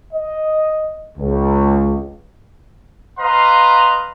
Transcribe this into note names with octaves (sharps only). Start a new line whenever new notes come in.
D#5
C#2
B4 D#5 F5 A#5 C6